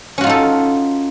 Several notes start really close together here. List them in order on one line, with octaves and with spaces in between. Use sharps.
C#4 F#4 F4 D#4 A4